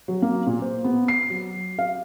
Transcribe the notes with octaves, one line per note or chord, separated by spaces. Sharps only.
F#3
A#3
A#2
C5
B3
C7
F#3
F5